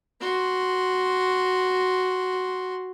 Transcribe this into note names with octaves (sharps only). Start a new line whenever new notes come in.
F#4 C6